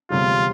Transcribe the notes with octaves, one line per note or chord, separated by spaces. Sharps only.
E1 D2 C3 G3 F4